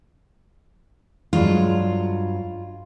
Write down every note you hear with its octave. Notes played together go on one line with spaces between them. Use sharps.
G2 F#3 G#3 F4